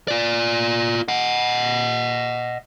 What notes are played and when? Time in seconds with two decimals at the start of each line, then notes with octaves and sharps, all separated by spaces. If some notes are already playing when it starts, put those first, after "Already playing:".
0.08 F4 D5
1.08 D#5 F#5